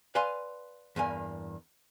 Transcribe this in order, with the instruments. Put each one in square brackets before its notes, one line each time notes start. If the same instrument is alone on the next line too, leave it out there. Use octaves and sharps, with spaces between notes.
[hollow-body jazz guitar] B4 D5 F5 G#5 C6
E2 G2 A#3 G#5